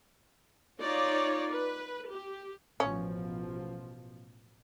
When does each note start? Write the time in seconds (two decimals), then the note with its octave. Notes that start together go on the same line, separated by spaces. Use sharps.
0.81 D#4 F4 C#5 D5
1.50 B4
2.09 G4
2.80 A1 B2 F3 C#4